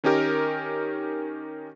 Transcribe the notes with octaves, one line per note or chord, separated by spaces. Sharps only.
D#3 C#4 D#4 G4 A#4